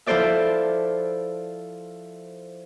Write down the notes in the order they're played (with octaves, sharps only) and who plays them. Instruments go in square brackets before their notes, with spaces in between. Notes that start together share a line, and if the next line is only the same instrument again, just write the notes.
[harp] F3 E4 A4 C5 D5 E5